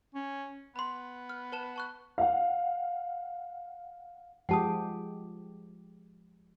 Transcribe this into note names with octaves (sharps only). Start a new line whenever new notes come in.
C#4
B3 B5 C6
F6
B4 A5 E7
A5 C#6 F#6
F5 F#5
F3 G#3 G4 F#5 A5 D#6